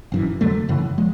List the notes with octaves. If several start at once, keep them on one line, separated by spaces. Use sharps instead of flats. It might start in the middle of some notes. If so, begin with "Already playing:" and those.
G1 F#2 C#3 E3
F2 D3 F#3 A3
F#2 C#3 E3
F3 G#3